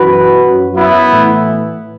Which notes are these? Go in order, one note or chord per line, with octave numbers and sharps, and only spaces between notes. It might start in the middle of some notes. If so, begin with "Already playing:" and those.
Already playing: F#2 E3 F#4 B4
F#2 F#3
B3 E4
A2 E3